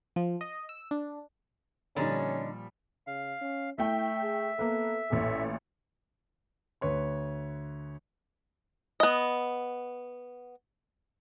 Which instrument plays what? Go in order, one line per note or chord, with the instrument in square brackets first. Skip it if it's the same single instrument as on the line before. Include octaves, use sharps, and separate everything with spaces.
[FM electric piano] F3
D#5
E6
D4
[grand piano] A#2 F3 G3 [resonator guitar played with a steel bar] D3 D#4 [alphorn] C#4
[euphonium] C#3 [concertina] F5
[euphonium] C#4
[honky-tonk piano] A3 G5 [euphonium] E4 [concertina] E5
[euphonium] G#4
[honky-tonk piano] A#3 B3 [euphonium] A4
[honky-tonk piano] A1 A#2 [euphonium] A4
[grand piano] D2 B4 C#5 C6
[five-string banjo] B3 D#5